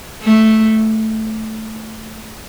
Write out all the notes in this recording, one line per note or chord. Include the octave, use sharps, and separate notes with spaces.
A3